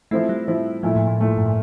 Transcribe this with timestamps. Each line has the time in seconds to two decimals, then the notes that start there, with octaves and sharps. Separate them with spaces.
0.11 F3 A3 C4 E4
0.29 G3
0.48 F3 C4 E4
0.83 A#2 F3 A3 E4
0.96 A2
1.07 A2
1.20 A#2 A3 E4
1.28 A2
1.37 G2
1.46 A2